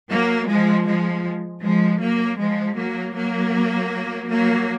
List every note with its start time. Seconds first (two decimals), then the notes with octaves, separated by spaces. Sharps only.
0.11 F#3 A#3
0.49 F3 G#3
0.86 F3 G#3
1.63 F3 G#3
2.01 F#3 A#3
2.39 F3 G#3
2.77 F#3 A#3
3.15 F#3 A#3
4.29 F#3 A#3